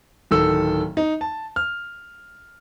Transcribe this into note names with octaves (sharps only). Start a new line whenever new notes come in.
D1 D#3 A4 E6
D#4
A5
F6